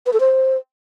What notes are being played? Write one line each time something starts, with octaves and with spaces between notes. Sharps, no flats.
B4
A4
C5